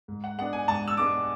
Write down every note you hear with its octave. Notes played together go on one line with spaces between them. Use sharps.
G#2
F#5
G#3 B3 D4 F#5
G#5
G#2 A5
E6
G#3 B3 D4 D6